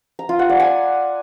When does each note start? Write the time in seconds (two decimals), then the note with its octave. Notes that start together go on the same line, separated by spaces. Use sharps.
0.19 A#5
0.29 F4
0.39 F#5
0.49 D5
0.60 G#5